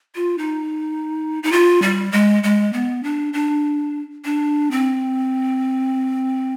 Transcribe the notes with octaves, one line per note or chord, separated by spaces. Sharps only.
F4
D#4
D#4
F4
G3
G#3
G#3
B3
D4
D4
D4
C4